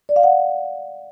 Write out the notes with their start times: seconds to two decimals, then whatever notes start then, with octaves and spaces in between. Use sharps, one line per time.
0.09 D5
0.16 F5
0.23 F#5